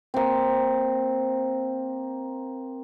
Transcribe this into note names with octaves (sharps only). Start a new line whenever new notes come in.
A#3 C4